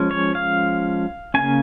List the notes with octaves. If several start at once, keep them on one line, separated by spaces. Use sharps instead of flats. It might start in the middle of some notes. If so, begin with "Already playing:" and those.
Already playing: F3 G#3 C#4
C#5
F5
C#3 A#3 C#4 G#5